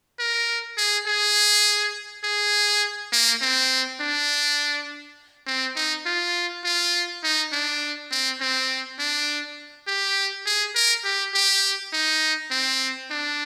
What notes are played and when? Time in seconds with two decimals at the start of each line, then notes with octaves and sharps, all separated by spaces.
0.19 A#4
0.77 G#4
1.07 G#4
2.24 G#4
3.13 A#3
3.42 C4
4.00 D4
5.47 C4
5.76 D#4
6.06 F4
6.64 F4
7.23 D#4
7.52 D4
8.11 C4
8.41 C4
8.99 D4
9.88 G4
10.46 G#4
10.75 A#4
11.05 G4
11.34 G4
11.93 D#4
12.51 C4
13.10 D4